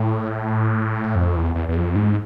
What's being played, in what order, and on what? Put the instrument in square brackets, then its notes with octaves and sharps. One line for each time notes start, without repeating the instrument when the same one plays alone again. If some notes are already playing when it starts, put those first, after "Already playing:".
Already playing: [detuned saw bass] A2
F2
E2
E2
E2
F2
G#2